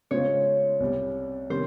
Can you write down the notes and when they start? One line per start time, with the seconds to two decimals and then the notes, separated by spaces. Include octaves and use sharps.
0.11 C#3 G#3 C#4 F4 C5 C#5
0.80 C2 C3 G3
1.50 C3 D#3 G3 C#4 C5